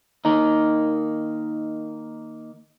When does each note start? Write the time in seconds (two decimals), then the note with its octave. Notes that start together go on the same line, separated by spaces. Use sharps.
0.25 D#3 A#3 D#4